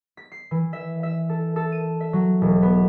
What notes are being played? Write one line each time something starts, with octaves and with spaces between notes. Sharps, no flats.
B6
C7
E3
E5
E5
A4
A4
D#7
E5
F#3
E1
B3